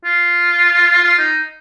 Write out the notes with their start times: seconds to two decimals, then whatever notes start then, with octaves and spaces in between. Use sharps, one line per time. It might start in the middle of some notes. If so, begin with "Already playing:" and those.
0.05 F4
1.03 F4
1.19 D#4